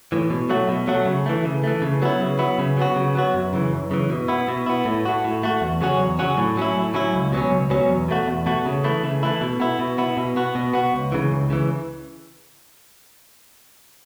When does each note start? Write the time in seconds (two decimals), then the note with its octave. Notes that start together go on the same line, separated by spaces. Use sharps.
0.12 A2 E3
0.30 B2
0.49 F#3 A3 F#4
0.69 B2
0.87 F#3 A3 F#4
1.06 C#3
1.26 E3 A3
1.45 C#3
1.64 E3 A3
1.82 C#3
2.02 F#3 B3 E4
2.20 C#3
2.39 F#3 B3 E4
2.59 C#3
2.77 F#3 B3 F#4
2.96 C#3
3.15 F#3 B3 F#4
3.34 F#2
3.53 C#3 E3
3.73 F#2
3.91 C#3 E3
4.09 B2
4.28 B3 E4
4.48 B2
4.66 B3 E4
4.85 A2
5.05 A3 F#4
5.24 A2
5.43 A3 F#4
5.61 E2
5.81 C#3 F#3 C#4 F#4
5.99 E2
6.19 C#3 F#3 C#4 F#4
6.37 A2
6.57 F#3 C#4 E4
6.75 A2
6.94 F#3 C#4 E4
7.14 C#2
7.32 B2 F#3 C#4
7.51 C#2
7.70 B2 F#3 C#4
7.90 E2
8.08 B2 A3 F#4
8.28 E2
8.46 B2 A3 F#4
8.66 C#3
8.84 E3 A3 E4
9.03 C#3
9.23 E3 A3 E4
9.41 B2
9.60 B3 E4
9.79 B2
9.98 B3 E4
10.17 B2
10.36 B3 F#4
10.55 B2
10.74 B3 F#4
10.93 C#2
11.12 C#3 E3
11.32 C#2
11.50 C#3 E3